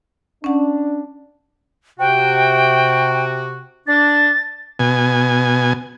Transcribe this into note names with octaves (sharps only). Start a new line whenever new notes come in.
C#4 D4 F#5
C3 F#4 G5
D4 A6
B2 G#5